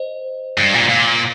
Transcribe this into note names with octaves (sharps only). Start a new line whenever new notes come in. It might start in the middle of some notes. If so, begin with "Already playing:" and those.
Already playing: C5 D#5
G2
A#2
A#2